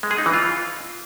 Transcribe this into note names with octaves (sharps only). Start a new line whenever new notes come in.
G#3
G#4
D#4
E3
F4